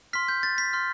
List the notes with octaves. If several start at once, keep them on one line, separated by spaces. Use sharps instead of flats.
C6 F6 B6
G6
A6
B6
C6 F6